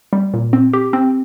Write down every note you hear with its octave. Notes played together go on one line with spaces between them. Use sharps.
G3
A#2
C4
G4
C4